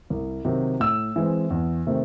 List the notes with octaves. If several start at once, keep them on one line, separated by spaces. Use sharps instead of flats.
C2
C3 D#3 F#3 C4
A2 E6
E3 G#3 C4
E2
C3 D#3 A3 C4